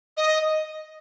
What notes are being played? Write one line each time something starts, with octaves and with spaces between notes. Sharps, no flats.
D#5